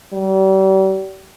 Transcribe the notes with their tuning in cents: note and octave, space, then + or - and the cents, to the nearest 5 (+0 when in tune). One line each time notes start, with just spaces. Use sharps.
G3 -40